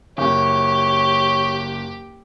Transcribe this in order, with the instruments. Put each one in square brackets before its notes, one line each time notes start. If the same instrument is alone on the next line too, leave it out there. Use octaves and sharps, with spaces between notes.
[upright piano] F#1 [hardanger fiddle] G4 [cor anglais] C#5